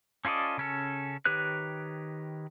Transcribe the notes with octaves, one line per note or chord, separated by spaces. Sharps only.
C#4 F4 A4 D5 D#5
C#3 C#4 A4
D#3 G4 B4 C#5 F#6